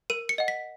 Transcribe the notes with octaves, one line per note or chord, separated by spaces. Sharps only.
A#4 D#7
C#7
D#5 F#5
B6